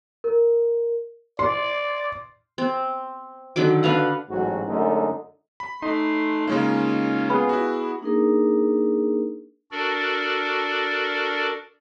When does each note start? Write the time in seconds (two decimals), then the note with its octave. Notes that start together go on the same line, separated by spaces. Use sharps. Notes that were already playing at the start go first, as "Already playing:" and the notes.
0.24 A#4
1.39 D5 C6
2.58 C4
3.56 D3 D#3 F#3 D6
3.83 D4 B4 F5 F#5
4.29 A1 G#2 F#3 F#4
4.68 F#2 D3 G#3 A3 D#4
5.60 B5
5.82 A3 D#4 C6
6.47 C#3 G#3 A#3 C#4 F4
7.30 B3 G#4
7.49 E4 F#4
8.01 A#3 D4 D#4 G#4 A#4
9.71 D4 F#4 A4 A#4 D5